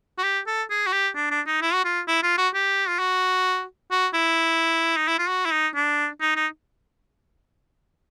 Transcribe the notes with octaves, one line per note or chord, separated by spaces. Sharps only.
F#4
G4
A4
G#4
F#4
G4
D4
D4
D#4
E4
F#4
F4
E4
F4
F#4
G4
F4
F#4
F#4
E4
D#4
E4
F4
F#4
E4
D#4
D4
D#4
D#4